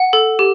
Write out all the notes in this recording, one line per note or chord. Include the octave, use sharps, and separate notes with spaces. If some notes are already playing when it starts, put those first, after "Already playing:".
Already playing: F#5
A4
G4